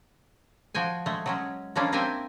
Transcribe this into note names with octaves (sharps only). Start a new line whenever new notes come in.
F3 F#4 G5 G#5
G#3 A3
F#3 G#3 C#4
F3 G3 G#3 A#3 C#4 D4
A#3 C4 A#4 E5 G5 G#5